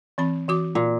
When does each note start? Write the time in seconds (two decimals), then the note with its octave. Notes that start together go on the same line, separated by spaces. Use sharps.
0.18 E3 C4 B5
0.48 E3 F#4 D6
0.75 A#2